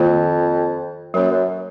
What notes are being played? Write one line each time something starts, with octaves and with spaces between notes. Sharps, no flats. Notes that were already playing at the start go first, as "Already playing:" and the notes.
Already playing: F2 D#3 A#3 F4
F#2 F#3 A#3 C#4
F#2